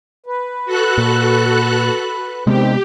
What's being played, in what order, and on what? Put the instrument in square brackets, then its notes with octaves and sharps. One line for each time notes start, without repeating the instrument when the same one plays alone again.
[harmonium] B4
[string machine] F#4 A4 F#6
[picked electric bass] A#2
[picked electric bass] C3 G#3 B3 [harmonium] D#3 C4 [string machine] G4